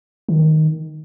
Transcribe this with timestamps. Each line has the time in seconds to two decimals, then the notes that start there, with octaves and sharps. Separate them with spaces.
0.29 D#3